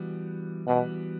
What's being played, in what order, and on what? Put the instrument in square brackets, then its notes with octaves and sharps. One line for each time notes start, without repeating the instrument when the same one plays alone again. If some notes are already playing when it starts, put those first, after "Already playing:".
Already playing: [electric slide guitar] E3 G3 B3 F#4
[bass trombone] B2 [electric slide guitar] E3 G3 B3 F#4